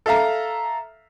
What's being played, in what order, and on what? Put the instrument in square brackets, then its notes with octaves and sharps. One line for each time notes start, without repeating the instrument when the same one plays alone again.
[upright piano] A4 E5 F5 A#5